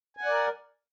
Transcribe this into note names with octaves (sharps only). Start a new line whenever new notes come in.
A#4 D5 F#5 G#5